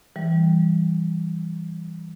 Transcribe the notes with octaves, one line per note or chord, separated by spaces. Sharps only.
E3 G3